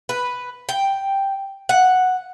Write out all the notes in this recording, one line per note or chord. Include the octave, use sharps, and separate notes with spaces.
B4
G5
F#5